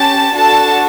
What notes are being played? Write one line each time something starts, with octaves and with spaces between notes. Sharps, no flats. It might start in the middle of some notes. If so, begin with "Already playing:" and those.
Already playing: C#4 G4 A5
D4 F#4 A4 A5